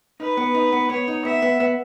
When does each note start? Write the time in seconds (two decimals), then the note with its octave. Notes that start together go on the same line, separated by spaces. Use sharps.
0.20 D#4 B4
0.37 B3
0.55 D#4
0.73 B3
0.90 B3 C#5
1.08 D#4
1.25 B3 E5
1.42 B3
1.60 B3